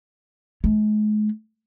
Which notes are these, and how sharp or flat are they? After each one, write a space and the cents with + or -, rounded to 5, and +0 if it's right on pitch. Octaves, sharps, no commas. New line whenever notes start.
G#3 +40